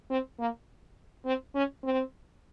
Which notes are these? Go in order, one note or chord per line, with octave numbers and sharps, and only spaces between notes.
C4
A#3
C4
C#4
C4